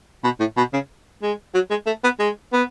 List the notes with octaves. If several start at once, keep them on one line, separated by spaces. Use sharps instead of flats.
B2
A2
B2
C#3
G#3
F#3
G#3
A3
B3
G#3
B3